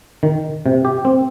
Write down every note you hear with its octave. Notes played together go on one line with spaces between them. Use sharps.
D#3
C3
G4
C4